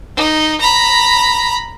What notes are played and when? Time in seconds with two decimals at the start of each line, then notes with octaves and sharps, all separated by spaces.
0.17 D#4
0.61 A#5 B5